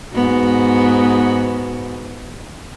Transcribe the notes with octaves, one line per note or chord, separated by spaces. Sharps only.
G#2 B3 F#4